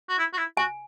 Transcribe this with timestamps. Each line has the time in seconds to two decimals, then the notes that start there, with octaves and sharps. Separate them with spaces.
0.09 F#4
0.18 E4
0.33 F#4
0.38 E4
0.57 F#4 G#5